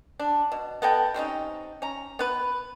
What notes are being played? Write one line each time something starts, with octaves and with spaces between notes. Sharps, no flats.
D4
B2
B3 A4 D#5 G5
G3 C4 C#4 D#4
C#4 A#5
B3 B4